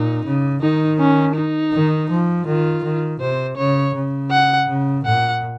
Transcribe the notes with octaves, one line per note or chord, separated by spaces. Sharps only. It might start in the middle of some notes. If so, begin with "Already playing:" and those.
Already playing: A#2 D#4
C#3
D#3 D#4
C#4
D#4
D#3
F3
D#3 F4
D#3
C3 C5
C#3 C#5
C#3
F#5
C#3
A#2 F#5